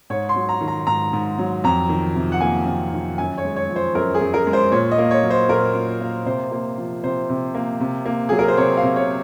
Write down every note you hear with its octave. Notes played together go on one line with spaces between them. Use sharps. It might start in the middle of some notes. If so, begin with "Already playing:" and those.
G#2 C#5
C6
F#3
A#5
D#3
A#5
G#2 A#5
G#2
F#3
F2 A#5
D#3
C3
F#5
A#3 G#5
F2
D#3
F#2 G#5
C#5
G#3
C#5
F3
C5
F#2 A#4
G#4
F#2
A#4
G#3
C5
A#2 C#5
D#5
A#3
C#5
F#3
C5
A#2 A#4
A#2
A#3
C3 C5
A#3
F3
C3 C5
C3
A#3
C3
A#3
F#3 G#4
A#4
C5
C3 C#5
F5
C3
C#5